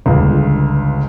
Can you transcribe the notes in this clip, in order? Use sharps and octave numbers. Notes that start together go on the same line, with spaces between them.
G1 C#2